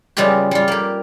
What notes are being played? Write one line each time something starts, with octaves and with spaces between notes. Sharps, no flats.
C#3 G3 G#3 B3 F4 G4
G3 F4
A#3 G4